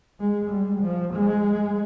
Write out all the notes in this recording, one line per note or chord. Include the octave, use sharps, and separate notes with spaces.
G#3
G3
F3
G#3